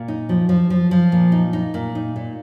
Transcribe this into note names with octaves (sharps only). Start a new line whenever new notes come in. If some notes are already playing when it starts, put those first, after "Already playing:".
Already playing: A#2
D#4
F3
F3
F3
F3
A#2
D#4
D#4
A#2
D#4
A#2